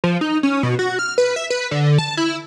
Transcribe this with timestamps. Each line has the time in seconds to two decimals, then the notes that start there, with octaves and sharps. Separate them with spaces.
0.04 F3
0.21 D#4
0.43 C#4
0.63 B2
0.79 F#4
0.99 F6
1.18 B4
1.36 E5
1.50 B4
1.71 D3
1.98 A5
2.17 E4